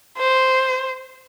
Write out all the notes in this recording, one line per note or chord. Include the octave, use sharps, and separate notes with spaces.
C5